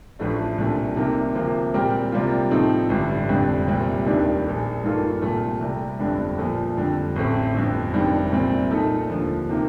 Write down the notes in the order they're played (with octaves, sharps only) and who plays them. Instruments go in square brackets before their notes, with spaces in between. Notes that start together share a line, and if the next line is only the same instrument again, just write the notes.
[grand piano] A1 A2 F3 A3 D4
C2 A#2 A3 D4
C2 C3 D#3 A#3
D2 C3 F3 A#3
A#2 G3 C4 G4 A#4
C2 C3 G3 A#3 F4
A2 F3 C4 D#4 A4
A1 G2 D3 G3 D4
F1 F2 D3 G3
C2 A#2 G3 C4
F1 D#2 D#3 G3 D4
A#1 A#2 A3
G2 D#3 A#3 F4 A4
C2 A#2 A3
C2 C3 G3
G1 F2 D3 G3 D4
A#2 F3 A3
F2 D3 G3
A1 A2 A3 C4
G1 F2 D3
F1 F2 D#3 G3 D4
C2 A#2 G3 C4
A#2 A3 D#4 A4
D#2 D3 F3
C3 D#3 A#3